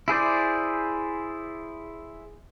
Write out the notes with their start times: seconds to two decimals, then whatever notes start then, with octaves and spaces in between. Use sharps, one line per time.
0.08 E4 G#4 C5 D5